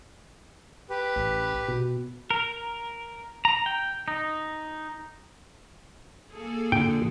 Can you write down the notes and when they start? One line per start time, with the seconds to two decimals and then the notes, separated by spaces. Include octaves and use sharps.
0.90 G4 B4
1.16 A1
1.68 B2
2.31 A#4
3.45 A#5
3.66 G5
4.08 D#4
6.33 A#3 G#4 A4
6.72 A#2 D3 G5